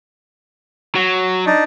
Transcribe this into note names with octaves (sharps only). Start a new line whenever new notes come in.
F#3
D4 D#4